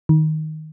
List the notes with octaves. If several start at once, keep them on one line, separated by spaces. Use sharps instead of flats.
D#3